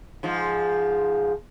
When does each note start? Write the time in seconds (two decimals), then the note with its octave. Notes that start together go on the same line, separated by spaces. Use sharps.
0.23 G#2 F3